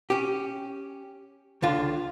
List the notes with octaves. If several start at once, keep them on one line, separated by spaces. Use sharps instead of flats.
C#4 G4
C#2 D3 F4